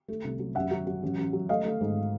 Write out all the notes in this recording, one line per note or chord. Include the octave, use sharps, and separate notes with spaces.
A3
C2
F#3
F#2 E5 F#5
F#3
F#3
A1
A1
F#3
A3 D#5 F5
A3
G#2